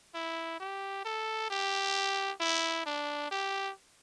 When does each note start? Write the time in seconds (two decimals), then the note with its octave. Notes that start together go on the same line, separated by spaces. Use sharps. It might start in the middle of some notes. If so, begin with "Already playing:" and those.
0.14 E4
0.60 G4
1.05 A4
1.50 G4
2.40 E4
2.86 D4
3.31 G4